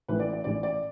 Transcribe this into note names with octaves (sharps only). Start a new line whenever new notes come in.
A1 A2 E3 B4
D5
D5
A1 A2 E3 D5
D5